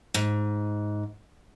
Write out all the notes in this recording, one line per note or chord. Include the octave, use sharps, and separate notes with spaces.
G#2